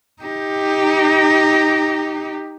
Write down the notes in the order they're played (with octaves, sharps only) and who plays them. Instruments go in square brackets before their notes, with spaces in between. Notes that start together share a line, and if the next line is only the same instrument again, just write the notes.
[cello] D#4 G4